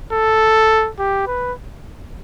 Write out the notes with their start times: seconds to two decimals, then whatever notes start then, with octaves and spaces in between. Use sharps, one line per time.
0.13 A4
0.99 G4
1.27 B4